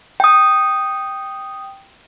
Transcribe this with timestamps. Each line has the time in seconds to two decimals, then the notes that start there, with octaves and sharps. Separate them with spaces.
0.20 G5 D#6